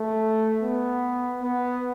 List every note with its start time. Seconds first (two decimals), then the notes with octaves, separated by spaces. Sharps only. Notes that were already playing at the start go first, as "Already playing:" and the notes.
Already playing: A3
0.62 B3
1.42 B3